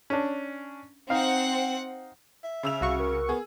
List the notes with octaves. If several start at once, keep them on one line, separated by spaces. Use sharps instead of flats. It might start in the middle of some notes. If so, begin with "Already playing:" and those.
C#4 D4
C4 D#4 F5 F#5
E5
C#3 E6 F7
C2 F#4 F5 C#6
A#4
B3 G#4